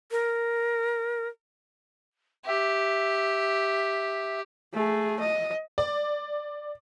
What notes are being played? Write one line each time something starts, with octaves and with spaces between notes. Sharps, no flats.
A#4
G4 E5
A3 G#4
D#5
D5